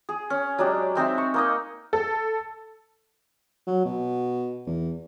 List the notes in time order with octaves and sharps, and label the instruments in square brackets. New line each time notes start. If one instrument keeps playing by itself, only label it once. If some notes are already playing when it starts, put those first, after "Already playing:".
[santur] G#4
C#4
F#3 G#3 D4 G4
G#3 C4 D#4 E5
C#6
A#3 D#4 D#5
[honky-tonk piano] A4
[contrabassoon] F#3
B2
E2